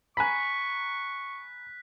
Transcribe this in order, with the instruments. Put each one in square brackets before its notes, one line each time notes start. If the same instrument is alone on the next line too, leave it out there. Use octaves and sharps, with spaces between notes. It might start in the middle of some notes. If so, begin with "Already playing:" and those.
[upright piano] G#5 A#5 B5 [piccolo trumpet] C#6 [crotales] F#6 B6